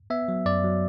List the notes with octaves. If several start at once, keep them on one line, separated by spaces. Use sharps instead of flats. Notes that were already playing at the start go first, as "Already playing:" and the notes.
B3 E5
F#3
F#2 D5
F#3